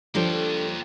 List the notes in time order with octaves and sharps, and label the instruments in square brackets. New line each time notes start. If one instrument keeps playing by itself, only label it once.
[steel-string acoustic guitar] F3 G3 [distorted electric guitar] A#3 G5 [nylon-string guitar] D4 A4 C5